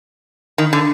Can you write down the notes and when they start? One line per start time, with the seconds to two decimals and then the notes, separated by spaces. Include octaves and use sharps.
0.58 D#3
0.73 D3